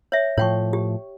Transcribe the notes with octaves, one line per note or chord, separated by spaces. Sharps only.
C#5 E5
A2 F3 C#5 G5 C#6
G4